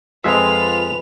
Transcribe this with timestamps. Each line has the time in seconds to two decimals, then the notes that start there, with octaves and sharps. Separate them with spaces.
0.24 F2 G#3 F4 B4 E5 F7